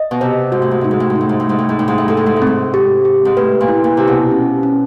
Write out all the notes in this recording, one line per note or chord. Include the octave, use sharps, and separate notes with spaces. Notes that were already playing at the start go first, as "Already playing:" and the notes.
Already playing: D#5
B2
C3 C5
G#2 F#4
A2
G#2
A2 D#4
G#2
A2
G#2
D#4
A2
G#2
A2
G#2 D#4
A2
G#2
A2 D#4
G#2
A2
G#2 A4
A2
G#2
A2
C4
G#2
G4
G4
G#2
A2 B4
A#2
E4
A#2
C3 G4
B2
C#4
C#4